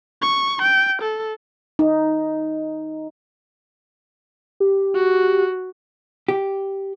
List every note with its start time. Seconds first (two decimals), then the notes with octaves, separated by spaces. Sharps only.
0.22 C#6
0.62 G5
1.02 A4
1.79 D#4
4.60 G4
4.95 F#4
6.28 G4